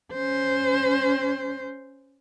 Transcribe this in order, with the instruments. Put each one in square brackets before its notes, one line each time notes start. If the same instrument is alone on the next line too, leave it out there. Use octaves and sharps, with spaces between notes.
[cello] C#4 C5